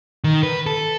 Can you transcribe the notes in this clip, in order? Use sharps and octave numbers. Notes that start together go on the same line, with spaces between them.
D#3
B4
A4